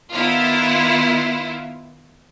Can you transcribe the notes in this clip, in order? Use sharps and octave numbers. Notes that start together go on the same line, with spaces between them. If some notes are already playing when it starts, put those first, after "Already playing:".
D#3 B3 E4 F4